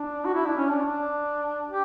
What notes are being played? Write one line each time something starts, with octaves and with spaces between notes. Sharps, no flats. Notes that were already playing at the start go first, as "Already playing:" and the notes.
Already playing: D4
F#4
E4
D4
C#4
D4
D4
G4